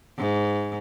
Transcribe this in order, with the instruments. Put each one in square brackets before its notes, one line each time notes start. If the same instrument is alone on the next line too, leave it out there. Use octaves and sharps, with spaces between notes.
[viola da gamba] G#2